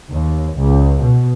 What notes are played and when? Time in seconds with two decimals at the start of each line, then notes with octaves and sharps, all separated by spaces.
0.12 D#2
0.59 C#2
1.01 B2